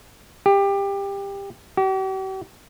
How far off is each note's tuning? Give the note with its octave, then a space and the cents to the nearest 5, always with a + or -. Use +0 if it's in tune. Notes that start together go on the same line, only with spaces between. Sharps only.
G4 +20
G4 -45